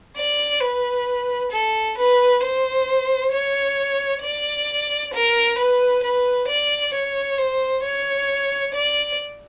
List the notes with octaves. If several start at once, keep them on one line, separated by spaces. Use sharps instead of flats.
D5
B4
A4
B4
C5
C#5
D5
A#4
B4
B4
D5
C#5
C5
C#5
D5